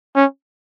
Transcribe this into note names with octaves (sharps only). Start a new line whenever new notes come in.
C#4